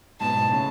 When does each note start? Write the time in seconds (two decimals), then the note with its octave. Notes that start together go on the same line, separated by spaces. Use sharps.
0.21 G#2 B2 A5
0.51 A2 C#3